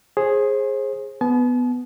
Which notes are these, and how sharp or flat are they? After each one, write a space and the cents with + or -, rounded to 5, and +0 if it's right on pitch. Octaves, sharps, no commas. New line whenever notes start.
G#4 +0 C5 +35
B3 +5 A5 -45